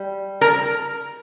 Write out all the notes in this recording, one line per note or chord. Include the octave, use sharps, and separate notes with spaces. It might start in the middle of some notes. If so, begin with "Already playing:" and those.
Already playing: G3
A#4